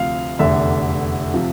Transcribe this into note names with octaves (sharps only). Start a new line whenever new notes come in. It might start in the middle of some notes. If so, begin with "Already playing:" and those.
Already playing: D2 C3 F3 F5
F1 E2 D3 E5
C3 F3